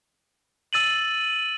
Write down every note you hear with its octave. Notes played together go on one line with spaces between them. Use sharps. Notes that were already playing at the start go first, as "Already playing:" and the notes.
E6 A6 D#7 F#7